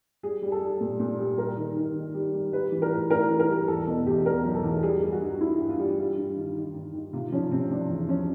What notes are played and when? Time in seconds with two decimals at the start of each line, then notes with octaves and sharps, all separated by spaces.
0.23 G3 G#4
0.43 G3
0.52 A4
0.62 G3
0.81 A#2
1.00 A#2
1.19 G3
1.38 G3 A#4
1.57 D#3
1.76 D#3
1.96 D#3
2.15 G3
2.34 G3
2.53 G3 B4
2.72 E3
2.82 A#4
2.92 A2
3.10 A2 A#4
3.30 E3
3.39 A#4
3.49 G3
3.68 E2 A4
3.87 B2 A4
4.06 E2 G4
4.26 B2 A#4
4.45 F#3
4.54 A4
4.64 E2
4.83 G3 G#4
5.03 G3
5.12 F#4
5.22 G2
5.41 G2 E4
5.60 G2
5.69 F4
5.79 G3
5.98 G3
6.18 G2
6.37 D#3
6.56 D#3
6.75 G2
6.94 D#3
7.13 C3 F4
7.32 F3 C#4
7.51 C3 C4
7.71 F3 D4
7.90 E2
8.09 F3 C#4